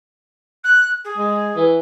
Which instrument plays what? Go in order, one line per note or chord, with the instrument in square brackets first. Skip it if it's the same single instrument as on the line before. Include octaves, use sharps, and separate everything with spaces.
[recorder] F#6
G#4
[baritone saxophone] G#3
E3